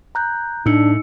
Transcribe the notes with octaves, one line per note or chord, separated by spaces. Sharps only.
A#5 F#6 G6
A2 D4 D#4 E6 C#7